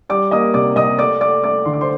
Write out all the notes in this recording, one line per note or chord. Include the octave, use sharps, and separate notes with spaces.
G3 D5 D6
A#3 D#5 D#6
C3 D5 D6
C3 D#5 D#6
A3 D5 D6
A3 D5 D6
A3 D5 D6
D3 C6
D6
C5 C6